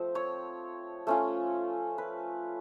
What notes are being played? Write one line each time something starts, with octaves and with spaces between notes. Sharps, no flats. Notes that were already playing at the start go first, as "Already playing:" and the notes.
Already playing: F3 A3 C4
C#5
A3 C#4 F4
B4